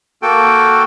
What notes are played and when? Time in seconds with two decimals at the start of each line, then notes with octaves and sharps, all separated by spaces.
0.22 A#3 F#4 A4 G5